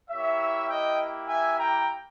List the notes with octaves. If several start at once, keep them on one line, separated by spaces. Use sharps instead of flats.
A#3 E4 G4 C#5 E5
D#5 G5
E5 G#5
G5 A#5